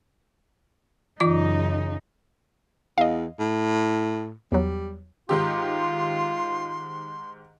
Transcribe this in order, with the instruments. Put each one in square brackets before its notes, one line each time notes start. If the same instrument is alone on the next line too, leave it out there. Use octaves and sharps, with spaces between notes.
[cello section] F#2 C#3 D#4 [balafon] E3 F4 D6
[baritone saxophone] E2 [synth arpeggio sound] D#5 F5
[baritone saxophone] A2
[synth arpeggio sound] E2 F#3 [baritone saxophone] G3
[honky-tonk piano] G#2 D#3 G4 [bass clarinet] F4 [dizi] C6